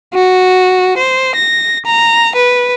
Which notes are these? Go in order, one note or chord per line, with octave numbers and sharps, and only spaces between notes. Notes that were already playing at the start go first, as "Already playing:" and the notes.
F#4
C5
A#6
A#5
B4